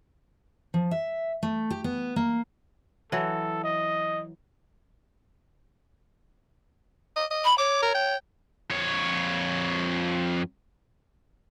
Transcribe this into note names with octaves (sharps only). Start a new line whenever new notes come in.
F3
E5
A3
G4
B3
A#3
E3 F#3 A4
D#5
D#5
D#5
B5
C#5 D6
A#4
G5
F2 C#5